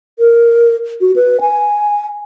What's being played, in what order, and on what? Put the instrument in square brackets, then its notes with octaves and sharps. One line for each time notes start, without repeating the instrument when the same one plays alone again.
[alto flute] A#4
F#4
B4
G#5